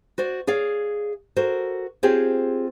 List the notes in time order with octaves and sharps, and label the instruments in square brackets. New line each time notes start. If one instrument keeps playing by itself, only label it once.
[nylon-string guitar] F#4 C5 D5
G#4 C#5 D5 F5
F#4 A4 A#4 C5
C4 F4 G4 G#4 C5 C#5